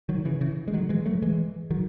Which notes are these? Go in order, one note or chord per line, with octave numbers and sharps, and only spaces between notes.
D#3 F#3
C#3 E3
C#3 E3
G#3
D#3 F#3
E3 G#3
F#3 A3
E3 G#3
D#3 F#3